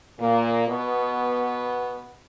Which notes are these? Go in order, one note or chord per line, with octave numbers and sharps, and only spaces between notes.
A#2 A#3
B2 B3